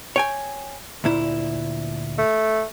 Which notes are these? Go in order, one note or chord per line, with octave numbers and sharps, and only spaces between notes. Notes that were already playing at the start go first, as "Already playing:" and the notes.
C#5 G5 G#5
D2 A#2 E4
A3